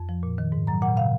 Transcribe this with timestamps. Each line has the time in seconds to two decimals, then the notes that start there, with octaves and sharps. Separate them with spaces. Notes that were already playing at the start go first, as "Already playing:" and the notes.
Already playing: F2
0.09 F3
0.23 A#2
0.38 D#3
0.52 G#2
0.67 F#3 A#5
0.82 A#2 F#5
0.97 C#3 F5